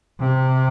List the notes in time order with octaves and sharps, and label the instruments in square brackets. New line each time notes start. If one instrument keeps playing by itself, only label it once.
[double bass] C3